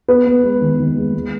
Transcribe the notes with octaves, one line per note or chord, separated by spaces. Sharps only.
B3 B4
B3
G#3
D#3
D#3
G#3
G#3